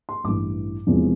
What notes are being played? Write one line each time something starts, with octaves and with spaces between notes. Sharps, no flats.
C6
A1 G2 E3 D6
E1 E2 C3 F3